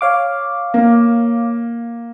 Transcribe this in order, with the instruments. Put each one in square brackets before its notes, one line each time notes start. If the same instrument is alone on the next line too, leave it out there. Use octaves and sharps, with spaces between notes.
[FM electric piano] C#5 F5 D6
[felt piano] A#3